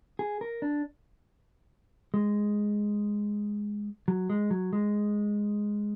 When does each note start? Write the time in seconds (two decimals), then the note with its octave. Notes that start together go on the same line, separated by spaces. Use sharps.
0.19 G#4
0.41 A#4
0.62 D4
2.14 G#3
4.08 F#3
4.30 G#3
4.51 F#3
4.73 G#3